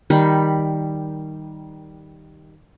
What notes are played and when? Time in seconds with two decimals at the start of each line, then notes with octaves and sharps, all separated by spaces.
0.10 D#3 G3 B5